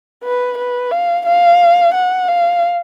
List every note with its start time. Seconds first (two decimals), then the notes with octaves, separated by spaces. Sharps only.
0.24 B4
0.58 B4
0.91 F5
1.26 F5
1.94 F#5
2.28 F5